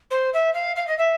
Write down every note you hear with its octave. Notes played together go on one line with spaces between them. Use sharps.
C5
E5
F5
F5
D#5
E5